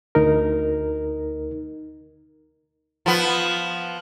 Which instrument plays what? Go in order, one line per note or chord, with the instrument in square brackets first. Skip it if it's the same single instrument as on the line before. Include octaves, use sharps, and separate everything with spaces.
[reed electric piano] D2 D#4 A#4
[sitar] F3 B3